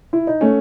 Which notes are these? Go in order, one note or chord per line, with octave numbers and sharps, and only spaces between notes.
E4
D#4
A3 C#4